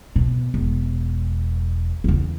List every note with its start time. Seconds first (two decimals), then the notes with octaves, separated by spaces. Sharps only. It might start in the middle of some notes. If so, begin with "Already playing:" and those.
0.16 B2
0.54 E1
2.04 E2 C#3